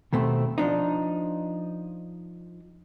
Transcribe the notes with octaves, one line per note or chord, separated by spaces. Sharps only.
D#2 B2 A3 C4
F3 D4 D#4